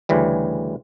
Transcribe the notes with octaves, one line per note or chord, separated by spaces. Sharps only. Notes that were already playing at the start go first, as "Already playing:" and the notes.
D2 C#3 E3 G3